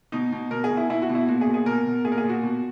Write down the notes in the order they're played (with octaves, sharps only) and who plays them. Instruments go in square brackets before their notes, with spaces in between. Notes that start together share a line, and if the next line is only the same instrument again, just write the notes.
[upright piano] B2 D#4
B2
B2 A#4
G#4
B2
E4
B2 E4
F#4
B2
E4
A#2 F#4
G#4
A#2
G#4
B2 A#4
B2
A#2 G#4
A#4
G#4
A#2
F#4
B2